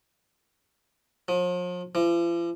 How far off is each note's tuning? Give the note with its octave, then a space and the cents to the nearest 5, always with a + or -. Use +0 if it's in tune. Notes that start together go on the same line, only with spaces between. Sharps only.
F3 +40
F3 -45